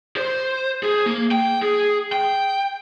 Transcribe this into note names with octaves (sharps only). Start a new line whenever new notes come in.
C5
G#4
A#3
G5
G#4
G5